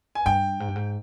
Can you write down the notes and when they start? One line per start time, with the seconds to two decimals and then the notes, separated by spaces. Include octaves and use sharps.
0.15 G#5
0.26 G2 G5
0.60 G#2
0.68 G2
0.76 G#2